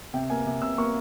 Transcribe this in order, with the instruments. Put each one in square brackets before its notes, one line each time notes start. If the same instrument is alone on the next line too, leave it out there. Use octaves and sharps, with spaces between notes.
[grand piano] C3 G5
A#3 G#5
C3
C3 E6
A#3 C#6